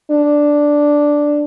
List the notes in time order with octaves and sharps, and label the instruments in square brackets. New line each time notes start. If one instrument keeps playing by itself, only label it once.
[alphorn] D4